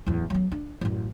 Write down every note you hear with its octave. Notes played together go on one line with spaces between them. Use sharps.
D1 E2
F#3 B3
D4
A1 F#2